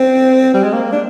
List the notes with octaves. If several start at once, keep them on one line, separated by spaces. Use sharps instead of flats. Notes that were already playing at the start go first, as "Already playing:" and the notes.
Already playing: C4
G3
G#3
A#3
D4